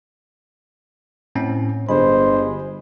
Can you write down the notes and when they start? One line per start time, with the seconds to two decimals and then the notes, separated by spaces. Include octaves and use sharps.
1.35 A2 C4 C#4
1.89 G1 G#3 C5 B5